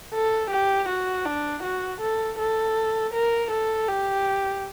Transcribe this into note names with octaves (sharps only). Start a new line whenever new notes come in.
A4
G4
F#4
D4
F#4
A4
A4
A#4
A4
G4